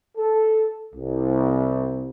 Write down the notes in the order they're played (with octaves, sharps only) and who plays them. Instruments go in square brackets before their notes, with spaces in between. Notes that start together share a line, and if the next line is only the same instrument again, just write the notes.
[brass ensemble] A4
C2